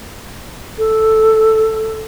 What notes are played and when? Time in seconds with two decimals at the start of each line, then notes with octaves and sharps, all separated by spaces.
0.78 A4